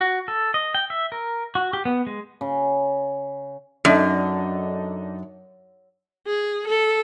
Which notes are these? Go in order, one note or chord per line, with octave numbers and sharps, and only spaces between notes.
F#4
A4
D#5
G5
E5
A#4
F#4
G4
B3
G#3
C#3
F#2 D4 D#4 A4
G#4
A4